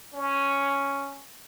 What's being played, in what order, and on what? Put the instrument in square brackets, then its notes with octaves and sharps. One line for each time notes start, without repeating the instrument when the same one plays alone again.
[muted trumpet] C#4